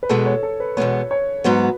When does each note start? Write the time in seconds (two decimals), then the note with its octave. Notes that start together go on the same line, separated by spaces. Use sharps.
0.03 B4
0.09 E2 B2 G#3 B3 A4
0.26 C#5
0.43 A4
0.60 B4
0.77 E2 B2 G#3 B3 C#5
1.11 C#5
1.44 G#2 F#3 B3 F#4 B4